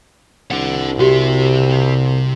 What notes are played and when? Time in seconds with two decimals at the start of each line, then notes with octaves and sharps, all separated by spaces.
0.51 C2 D4 F#5
0.99 C3 F#4 G4 E5